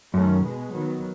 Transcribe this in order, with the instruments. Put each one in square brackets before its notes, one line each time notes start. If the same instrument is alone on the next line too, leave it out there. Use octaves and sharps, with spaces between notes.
[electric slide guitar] F#2 [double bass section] D#3 A3 C#4
[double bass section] B2 G#3 B3
D#3 F#3 B3